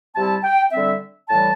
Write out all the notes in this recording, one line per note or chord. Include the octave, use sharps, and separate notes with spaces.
C3 G3 C4 E4 A5
G5
D3 G3 C4 E5
A2 E3 G3 A5